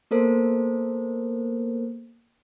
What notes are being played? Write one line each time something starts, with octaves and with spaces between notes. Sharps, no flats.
A#3 B3 A4 A#4 C5